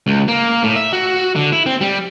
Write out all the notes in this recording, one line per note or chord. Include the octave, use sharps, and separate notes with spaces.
C#2
A#3
A2
E5
F#4
D3
E4
C4
G3